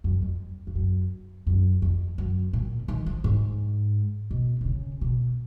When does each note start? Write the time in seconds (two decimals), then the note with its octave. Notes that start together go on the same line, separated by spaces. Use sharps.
0.04 F#2
0.22 F2
0.67 F2
0.75 F#2
1.47 F#2
1.82 F2
2.18 F#2
2.53 A#2
2.88 D#3
3.06 F3
3.24 G#2
4.31 B2
4.61 B2
4.66 C#3
5.01 B2